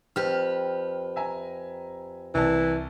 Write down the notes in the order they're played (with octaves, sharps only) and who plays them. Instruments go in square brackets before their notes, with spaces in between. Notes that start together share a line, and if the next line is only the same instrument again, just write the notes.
[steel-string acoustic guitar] F2 G4 B4 [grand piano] F6
[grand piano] E5 G#5 A#5
[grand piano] C2 A5 [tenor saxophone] E3